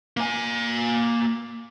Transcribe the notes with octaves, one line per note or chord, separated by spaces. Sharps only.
A#3 G#5